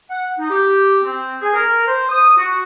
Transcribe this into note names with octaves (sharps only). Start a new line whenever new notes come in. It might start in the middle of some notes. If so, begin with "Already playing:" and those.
F#5
D#4
G4
C4
G#4
A#4
C5
D#6
F#4